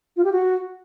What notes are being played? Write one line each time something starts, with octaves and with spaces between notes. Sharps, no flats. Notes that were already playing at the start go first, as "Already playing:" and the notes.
F4
G4
F#4